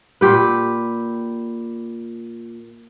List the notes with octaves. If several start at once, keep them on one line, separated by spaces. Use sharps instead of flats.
A#2 G4 B4